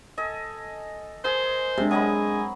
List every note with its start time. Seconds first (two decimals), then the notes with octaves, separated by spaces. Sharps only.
0.17 A4 D#5 G#5
1.24 G#4 A#4 C5
1.78 C3 G#3 D4
1.91 F#3 G#4 D#5 B5